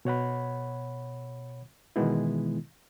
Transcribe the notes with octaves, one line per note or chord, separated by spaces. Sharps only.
B2 C#5 F#5 B5
B2 D#3 E3 G#3 B3 E4